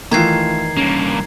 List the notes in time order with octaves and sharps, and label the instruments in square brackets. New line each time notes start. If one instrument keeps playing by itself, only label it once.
[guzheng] D#3 E3 [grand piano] A3 F4 [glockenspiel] A#5 G#6 C7
[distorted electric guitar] G2 A#3 [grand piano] C#4